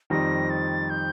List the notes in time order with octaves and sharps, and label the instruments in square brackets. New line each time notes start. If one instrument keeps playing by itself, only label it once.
[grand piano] F2 D#3 G3 C4 D#4 [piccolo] A#6
[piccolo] A6
G6